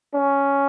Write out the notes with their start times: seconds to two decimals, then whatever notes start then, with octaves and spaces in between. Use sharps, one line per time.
0.15 C#4